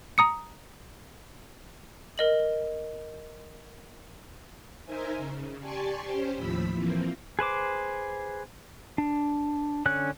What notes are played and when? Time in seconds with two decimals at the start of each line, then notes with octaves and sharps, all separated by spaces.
0.18 A#5 D#6 C#7
2.18 A#4 D#5 F#7
4.85 D#4 A#4 C5 E5 G#5
5.17 C#3
5.60 G4 D5 G#5 A5 C6 C#6
6.05 C#4 G4 C5
6.35 D#2 A2 F3 B5 E6 B6
6.73 E3 F3 A#3 C4
7.39 G#4 B4 C5 D6
8.98 D4
9.86 D3 C#4 F#6